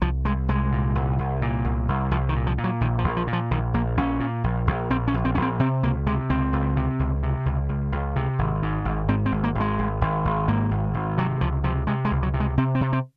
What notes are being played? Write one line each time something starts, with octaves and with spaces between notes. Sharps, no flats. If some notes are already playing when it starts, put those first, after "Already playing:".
C2 F3
C2 G#3
C2 G#3
A#2
C2
C2
A#2
C2
C2
C2 F3
D#3
A#2
F3
A#2
F#3
A#1 D#3
F3
A#1
F3
A#2
F3
A#1 D#3
A#1 A#3
A#1 C#4
A#2
A#1
A#1
A#1 C4
C#4
A#1
C4
A#1 C#4
C4
C3 C4
C#2 A#3
C3 G#3
C#2 C4
C#2
C3
C#2
C3
C#2
C#2
C#2
C3
G#1
G#2
G#1
G#2 C4
C4
G#1
A#3
G#1
G#3
G#1
G#1
G#1
G#2 A#3
G#1
G#1
C3 F#3
C#2 F3
C3 F3
C3 G#3
G#3
C#2
F#3
C3
G#3
C3 C4
C4
C3
C4